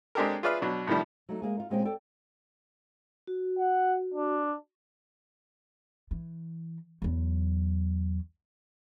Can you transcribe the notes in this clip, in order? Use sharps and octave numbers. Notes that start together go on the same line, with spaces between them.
G#3 C4 D4 G4 A4 A#4
F4 G#4 B4 D5 E5 F6
B2 F#3 D4
A2 C3 D#3 F3 G3
F#3 A3 D#4
G#3 A#3 G#4
D#4 F4
A#2 G#3 C4 C#4 G5
A4 D5 G5
F#4
F#5
D4
E3
E2 F#3